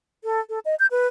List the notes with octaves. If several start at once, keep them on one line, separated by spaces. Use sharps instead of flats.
A4
A4
D#5
G6
B4